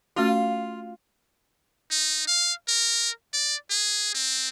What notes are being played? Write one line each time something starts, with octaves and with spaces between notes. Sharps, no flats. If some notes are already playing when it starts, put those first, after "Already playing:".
A3 C#4 F4 F#4
D#4
F5
A#4
D5
G#4
C4